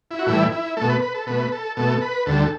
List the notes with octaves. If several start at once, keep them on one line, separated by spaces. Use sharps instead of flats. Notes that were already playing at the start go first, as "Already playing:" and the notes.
E4
F#4
A2 E3 G3 E4
E4
B2 A3 A4
B4
B4
A4
B2 A3 B4
A4
B2 A3 A4
B4
D2 D3 G3 A4